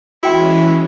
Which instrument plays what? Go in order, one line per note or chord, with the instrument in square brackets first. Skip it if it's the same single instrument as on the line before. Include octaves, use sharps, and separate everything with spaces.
[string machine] E3 G#3 C#4 [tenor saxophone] E4 [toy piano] F#4 G5 C6